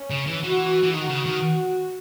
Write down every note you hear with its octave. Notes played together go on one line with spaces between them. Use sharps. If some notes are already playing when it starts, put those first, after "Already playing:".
Already playing: C#4
C#3
E3
E3 F#4
E3
D#3 F#4
C#3
D#3